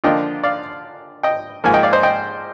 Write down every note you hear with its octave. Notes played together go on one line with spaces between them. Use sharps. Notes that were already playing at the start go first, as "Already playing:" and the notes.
D3 F3 A#3 D4 F4 D#5 G5
D5 F5
D#5 G5
G#2 F3 A#3 G#5
D#5 G5
D5 F5
C5 D#5
D#5 G5